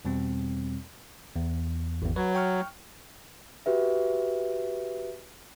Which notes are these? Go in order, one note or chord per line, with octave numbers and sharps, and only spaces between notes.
E2 B2 G3 C4
E2
G#1 E2
F#3 B4 C#5
G5 C#6 F6
F#4 G4 B4 E5